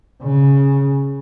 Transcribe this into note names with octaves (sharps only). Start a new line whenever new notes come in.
C#3